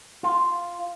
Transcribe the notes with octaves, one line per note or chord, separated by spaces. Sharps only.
F4